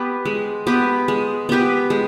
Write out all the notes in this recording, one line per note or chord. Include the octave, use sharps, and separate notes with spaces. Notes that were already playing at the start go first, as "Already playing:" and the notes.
Already playing: B3 G4 B4
G#3
B3 G4 B4
G#3
B3 G4 B4
G#3